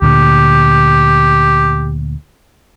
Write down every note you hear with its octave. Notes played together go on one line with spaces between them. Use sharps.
D2 A#2 D3 G4